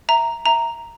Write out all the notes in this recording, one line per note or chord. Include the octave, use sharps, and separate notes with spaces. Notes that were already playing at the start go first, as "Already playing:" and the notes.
E5 A#5
E5 A#5